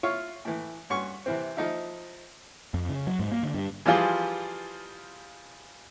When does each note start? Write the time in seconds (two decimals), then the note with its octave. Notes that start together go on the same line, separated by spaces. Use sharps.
0.03 E4 F4 C#5 F5
0.45 A2 E3
0.90 G2 C#4 F#4 C6 C#6
1.26 C3 E3 C4
1.57 F3 D#4 E4
2.74 F2
2.89 C#3
3.07 F#3
3.19 G#2
3.32 A#3
3.43 D3
3.54 G2
3.86 E3 F3 G3 F4 G#4